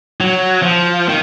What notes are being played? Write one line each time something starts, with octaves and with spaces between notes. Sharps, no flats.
F#3
F3
D#3